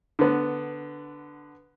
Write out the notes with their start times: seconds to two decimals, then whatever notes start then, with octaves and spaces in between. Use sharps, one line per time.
0.19 D3 B3